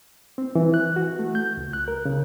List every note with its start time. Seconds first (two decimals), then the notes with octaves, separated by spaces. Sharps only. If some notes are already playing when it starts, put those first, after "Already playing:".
0.38 C4
0.55 E3
0.74 F#6
0.96 F#4
1.19 A3
1.35 G6
1.57 C#2
1.73 F#6
1.88 A#4
2.05 C#3